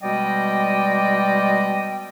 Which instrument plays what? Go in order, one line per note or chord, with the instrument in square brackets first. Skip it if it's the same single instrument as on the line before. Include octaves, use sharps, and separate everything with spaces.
[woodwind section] B2 G3 G#3 D5 D#5 G5